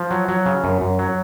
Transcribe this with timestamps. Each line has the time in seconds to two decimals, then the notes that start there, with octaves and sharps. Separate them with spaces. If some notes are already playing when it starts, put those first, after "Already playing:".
Already playing: F3
0.11 F#3
0.28 F#3
0.46 C#3
0.64 F#2
0.81 F#2
0.99 F#3